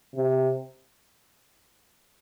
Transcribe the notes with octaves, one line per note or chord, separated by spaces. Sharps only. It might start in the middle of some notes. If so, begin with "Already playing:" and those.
C3